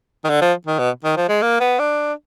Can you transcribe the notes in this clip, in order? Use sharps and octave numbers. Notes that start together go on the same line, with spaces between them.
D#3
D3
F3
D#3
B2
D#3
F3
G#3
A#3
B3
D4